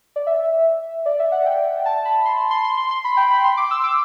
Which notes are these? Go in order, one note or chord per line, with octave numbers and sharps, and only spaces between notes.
D5
E5
D5
E5
F#5
G5
A5
B5
C6
C6
C6
C6
C6
B5
G5
B5
C6
D6
E6
D6